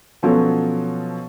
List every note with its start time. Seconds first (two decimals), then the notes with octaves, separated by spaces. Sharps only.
0.23 B2 F3 F#3 C#4 A4